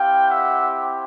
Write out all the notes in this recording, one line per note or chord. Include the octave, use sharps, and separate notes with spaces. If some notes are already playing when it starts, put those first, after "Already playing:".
Already playing: C4 E4 G4 F5 G5
E5 F#5